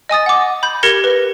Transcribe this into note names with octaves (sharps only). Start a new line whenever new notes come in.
D#5 G#5 D#6 A6
F#5 D6
B5 G6
G4 A#4 G#6 A#6 C#7 G7
B4